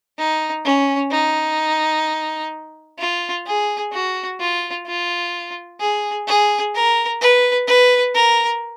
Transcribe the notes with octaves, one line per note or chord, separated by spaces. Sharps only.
D#4
C#4
D#4
F4
G#4
F#4
F4
F4
G#4
G#4
A#4
B4
B4
A#4